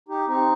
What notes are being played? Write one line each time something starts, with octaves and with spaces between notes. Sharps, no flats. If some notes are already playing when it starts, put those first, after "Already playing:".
D#4 G4
C4 D#4